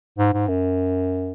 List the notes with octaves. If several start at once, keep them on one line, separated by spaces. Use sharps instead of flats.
G#2
G#2
F#2